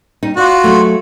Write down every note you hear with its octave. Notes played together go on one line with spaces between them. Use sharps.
G3 D#4
F4 F#4 D5
F#3 A3